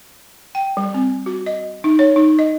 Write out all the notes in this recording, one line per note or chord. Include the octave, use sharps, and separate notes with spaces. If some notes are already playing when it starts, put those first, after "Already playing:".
G5
G3
C4
F#4
D#5
D#4
C#5
D#4
D#5